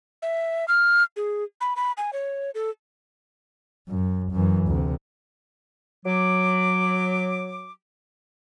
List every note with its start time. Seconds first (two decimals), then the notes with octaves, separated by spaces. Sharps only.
0.22 E5
0.68 F6
1.16 G#4
1.61 B5
1.76 B5
1.97 G#5
2.13 C#5
2.55 A4
3.88 F#2
4.32 F#2 E3
4.67 D2 C3
6.05 F#3 D6